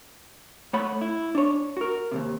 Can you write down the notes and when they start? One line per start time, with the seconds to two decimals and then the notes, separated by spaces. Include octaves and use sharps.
0.73 A3 C#5 F#5 B5
1.01 E4
1.35 D4 C#5
1.77 F#4 A#4
2.12 D#2 G#2 C3